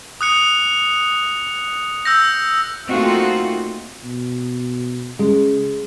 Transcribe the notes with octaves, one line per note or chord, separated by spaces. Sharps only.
D#6 F#6 C#7
E6 G6 A#6
A3 A#3 C4 D#4 F4 F#4
B2
C#3 G#3